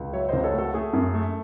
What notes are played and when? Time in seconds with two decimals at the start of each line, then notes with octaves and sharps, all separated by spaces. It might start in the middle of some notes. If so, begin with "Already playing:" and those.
Already playing: C#2
0.13 F#3 C#5 E5
0.29 C#2 C5 D#5
0.44 A4 C#5
0.53 A3
0.58 F#4 A4
0.74 A3 G#4
0.93 F#2
1.14 A3